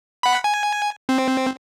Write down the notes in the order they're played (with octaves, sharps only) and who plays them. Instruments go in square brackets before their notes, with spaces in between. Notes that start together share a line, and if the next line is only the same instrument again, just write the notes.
[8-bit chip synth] F#5 B5
G#5
C4